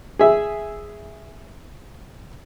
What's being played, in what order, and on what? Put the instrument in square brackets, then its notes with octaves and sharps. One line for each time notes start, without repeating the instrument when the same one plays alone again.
[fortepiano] G#4 E5